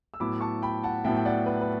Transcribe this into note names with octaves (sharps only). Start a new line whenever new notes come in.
E6
A2 F#3 B3 E4 B5 D6
A5 C#6
G5 B5
F#5 A5
A2 F#3 B3 E4 E5 G5
G5
D5 F#5
B4
B4